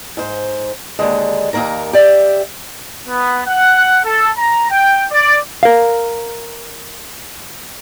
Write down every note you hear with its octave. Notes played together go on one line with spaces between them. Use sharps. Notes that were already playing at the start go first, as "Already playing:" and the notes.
G#2 C5
D#2 D3 G#3
D#2 C3 A#3 A#4 A#5
G4 D5 E5
B3
F#5
A4
A#5
G5
D5
A#4 F5